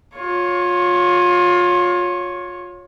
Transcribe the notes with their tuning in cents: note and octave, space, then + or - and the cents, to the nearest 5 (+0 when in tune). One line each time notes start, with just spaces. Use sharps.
F4 +30 C#5 +0